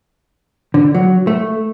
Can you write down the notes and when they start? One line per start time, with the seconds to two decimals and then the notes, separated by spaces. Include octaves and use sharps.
0.74 D3
0.95 F#3
1.27 A3